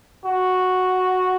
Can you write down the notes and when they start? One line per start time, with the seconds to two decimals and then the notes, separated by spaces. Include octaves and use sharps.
0.25 F#4